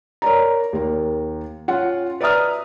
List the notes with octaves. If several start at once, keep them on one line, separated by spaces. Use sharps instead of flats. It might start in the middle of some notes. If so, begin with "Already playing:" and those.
A#4 C#5 D5 A#5
D#2 A#4
C#4 F4 F#5
B4 D5 E5 A#5 D#6 F6